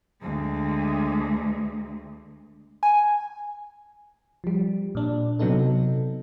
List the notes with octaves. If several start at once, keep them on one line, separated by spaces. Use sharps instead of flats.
D2 G#3
G#5
F3 G3
A#2 D4
C3 F#3 B3 D#4 A4